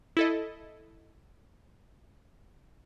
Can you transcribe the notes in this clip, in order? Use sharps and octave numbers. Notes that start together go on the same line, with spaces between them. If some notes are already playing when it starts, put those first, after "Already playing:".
E4 A4 D#5